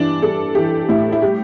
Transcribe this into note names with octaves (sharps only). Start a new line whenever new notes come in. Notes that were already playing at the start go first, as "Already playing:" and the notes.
Already playing: G2 E3 D4
G3 A4
E3 G4
A2 E4
E4
G3 G4